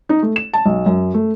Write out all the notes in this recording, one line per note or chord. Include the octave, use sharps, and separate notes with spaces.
D#4
A3
E7
A5
B1
F#2
A3